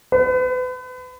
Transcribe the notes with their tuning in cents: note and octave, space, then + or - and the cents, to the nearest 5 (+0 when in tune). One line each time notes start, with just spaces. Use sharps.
B4 +35